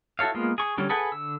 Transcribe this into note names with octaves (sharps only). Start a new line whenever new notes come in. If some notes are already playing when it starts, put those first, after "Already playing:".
E4 F#4 A4 C#5 F5
G#3 A#3 B3 F4
G#4 C#6
D3 F#3 G3 C#4
G#4 A4 B4 F#5 G#5
D3 E6